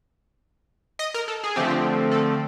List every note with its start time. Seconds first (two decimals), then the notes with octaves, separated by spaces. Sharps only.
0.99 D#5
1.14 A#4
1.28 A4
1.44 G#4
1.56 D3 F3 A3 C4 G4
2.11 A4